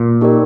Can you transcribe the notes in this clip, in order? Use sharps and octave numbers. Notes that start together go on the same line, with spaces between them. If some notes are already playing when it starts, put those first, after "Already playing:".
Already playing: A#2
D#4 G4 A#4 D5